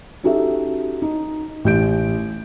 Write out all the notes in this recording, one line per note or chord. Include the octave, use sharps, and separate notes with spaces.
C#4 D#4 F#4 G4 A4 E5
D#4
A1 G4 G6 D7